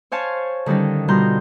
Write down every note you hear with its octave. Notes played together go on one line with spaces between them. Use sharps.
C5 C#5 F5 G#5 A5
D3 D#3 G3 C#4 D#4
B2 G3 F4 A#5 C6 G6